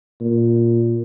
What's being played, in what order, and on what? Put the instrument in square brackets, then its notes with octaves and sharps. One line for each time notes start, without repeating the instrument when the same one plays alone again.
[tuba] A#2